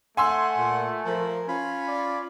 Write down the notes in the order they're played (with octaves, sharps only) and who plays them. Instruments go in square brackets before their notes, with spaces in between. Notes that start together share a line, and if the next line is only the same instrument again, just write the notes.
[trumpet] A3 [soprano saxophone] F#5 [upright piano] G#5 C6 E6
[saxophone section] A#2
[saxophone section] F3 [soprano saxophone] A#4
[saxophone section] C#4 F4 [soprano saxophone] B5
[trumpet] D5